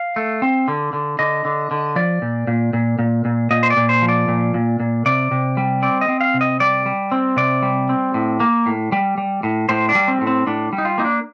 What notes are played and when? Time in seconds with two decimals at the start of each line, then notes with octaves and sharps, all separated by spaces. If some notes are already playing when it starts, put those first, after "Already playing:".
Already playing: F5
0.16 A3
0.42 C4
0.68 D3
0.93 D3
1.19 D3 D#5
1.45 D3
1.71 D3
1.96 F3 D5
2.22 A#2
2.47 A#2
2.73 A#2
2.99 A#2
3.25 A#2
3.51 A#2 D#5
3.63 C5
3.70 D5
3.77 A#2
3.89 C5
4.02 F3
4.09 D5
4.28 A#2
4.54 A#2
4.80 A#2
5.06 C3 D5
5.31 C3
5.57 G3
5.82 C4 D5
6.01 D#5
6.08 C4
6.21 F5
6.34 C3
6.41 D#5
6.60 G3 D5
6.86 G3
7.12 C4
7.36 C3 D5
7.62 G3
7.89 C4
8.14 A2
8.40 A#3
8.66 A2
8.92 G3
9.18 G3
9.43 A2
9.69 A2 C5
9.89 D4
9.95 G3
10.08 C4
10.21 A2
10.27 C4
10.47 A2 D4
10.73 G3
10.78 D#4
10.85 F4
10.98 A#3 D#4
11.05 D4